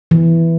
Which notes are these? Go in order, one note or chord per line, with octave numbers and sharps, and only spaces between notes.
E3